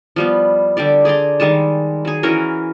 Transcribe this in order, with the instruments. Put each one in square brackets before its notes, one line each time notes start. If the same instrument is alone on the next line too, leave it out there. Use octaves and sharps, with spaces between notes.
[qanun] F3 G3 B3
D3 G3 G4 D5
G#4 D5 A#5 C6
D#3 G3 G#3 A5
F#3 G#4
E3 C#4 F#4 A#4